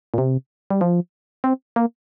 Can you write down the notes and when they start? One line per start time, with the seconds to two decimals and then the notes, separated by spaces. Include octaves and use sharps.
0.14 A#2
0.18 C3
0.70 G3
0.81 F3
1.44 C4
1.76 A#3